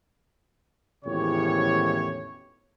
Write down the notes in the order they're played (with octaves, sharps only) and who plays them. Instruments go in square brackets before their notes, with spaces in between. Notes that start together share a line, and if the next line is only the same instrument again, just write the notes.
[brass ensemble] G#1 E2 A2 C#3 G4 C#5